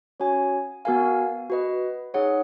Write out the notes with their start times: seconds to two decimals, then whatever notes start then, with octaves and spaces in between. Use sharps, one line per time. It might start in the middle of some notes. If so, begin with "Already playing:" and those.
0.20 C#4 F#4 C#5 G#5
0.85 B3 F#4 A#4 F5 G#5
1.50 F#4 B4 D#5
2.14 D#4 G#4 C#5 F#5